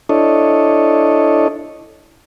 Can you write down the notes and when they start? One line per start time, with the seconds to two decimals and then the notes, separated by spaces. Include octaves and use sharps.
0.09 D4 E4 A4 C#5 D#5